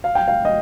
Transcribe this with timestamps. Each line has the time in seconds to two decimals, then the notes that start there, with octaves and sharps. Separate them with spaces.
0.04 F5
0.15 G5
0.28 F5
0.45 D#5